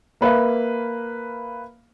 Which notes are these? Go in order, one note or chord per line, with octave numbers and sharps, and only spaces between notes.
A#3 B4 E5 F5